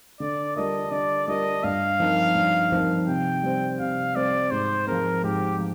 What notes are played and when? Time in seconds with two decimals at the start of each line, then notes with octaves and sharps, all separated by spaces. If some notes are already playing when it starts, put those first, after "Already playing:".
0.20 D3 D5
0.56 G3 D4 F4 A#4 D#5
0.91 D3 D5
1.28 G3 D4 F4 A#4 D#5
1.64 G2 F5
2.00 F3 C4 D#4 A#4
2.35 G2
2.72 F3 C4 D#4 A#4
3.07 C3 G5
3.43 G3 C4
3.80 C3 F5
4.16 G3 C4 D5
4.51 G#2 C5
4.87 F3 G#3 C4 A#4
5.24 G#2 G4
5.59 F3